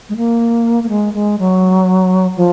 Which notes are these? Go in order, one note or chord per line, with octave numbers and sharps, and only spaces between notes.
G#3
A#3
A#3
G#3
G#3
F#3
F3